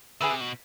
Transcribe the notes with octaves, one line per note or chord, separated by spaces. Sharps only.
D3 G#4 B4 E5
C3
B2